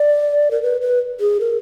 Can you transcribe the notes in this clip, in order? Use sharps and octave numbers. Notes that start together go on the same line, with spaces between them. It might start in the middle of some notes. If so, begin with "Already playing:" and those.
Already playing: D5
A#4
B4
B4
G#4
A#4